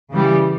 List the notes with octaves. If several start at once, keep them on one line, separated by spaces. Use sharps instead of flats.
C#3 E3 G3